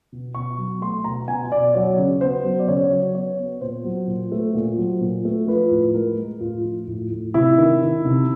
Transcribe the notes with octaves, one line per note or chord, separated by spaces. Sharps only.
B2
B2 C#6
F#3
A3 C6
B2 A#5
B2 G#5
B2 D5
F#3 C#5
C#3
B3 C5
F#3
D5
C#3 C#5
F#3
B3 C#5
B3
A#2 C5
F#3
A#2
A3
A#2
F#3
A#2
A3
F3 B4
A2
G#3 A#4
G#3
A2 F4
F3
A2
A2
C3 E4
D#3
D#3
C3